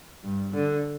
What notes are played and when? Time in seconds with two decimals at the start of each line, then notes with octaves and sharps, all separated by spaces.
0.23 G2
0.53 D3